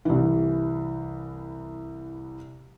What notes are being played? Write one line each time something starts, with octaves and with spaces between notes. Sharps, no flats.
C2 E3